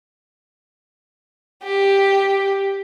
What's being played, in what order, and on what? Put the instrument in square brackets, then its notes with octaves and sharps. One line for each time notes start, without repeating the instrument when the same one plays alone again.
[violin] G4